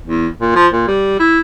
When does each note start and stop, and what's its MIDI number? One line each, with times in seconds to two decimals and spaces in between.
0.06 0.27 40
0.40 0.53 46
0.55 0.67 53
0.73 0.83 46
0.87 1.17 55
1.19 1.39 64